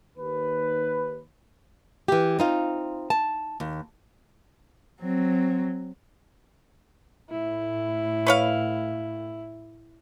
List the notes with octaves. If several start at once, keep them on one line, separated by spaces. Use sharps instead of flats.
D#2 B4
E3 G4
C4 D#4 F4
A5
D#2
F#3 C4
A2 E4
B4 C#5 F5